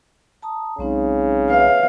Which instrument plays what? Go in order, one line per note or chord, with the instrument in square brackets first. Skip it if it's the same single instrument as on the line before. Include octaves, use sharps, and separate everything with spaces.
[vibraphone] A5 A#5 D#6
[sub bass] B1 [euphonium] C#3 [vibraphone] G#3 C4 D#4
[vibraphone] B4 C#5 E5 [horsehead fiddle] F5